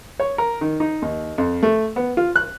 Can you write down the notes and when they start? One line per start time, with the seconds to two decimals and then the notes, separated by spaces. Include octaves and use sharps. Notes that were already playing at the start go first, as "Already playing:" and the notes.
0.20 C#5
0.38 A#4
0.61 D#3
0.80 D#4
1.02 D#2
1.38 F2
1.63 A3
1.96 B3
2.17 F4
2.36 F#6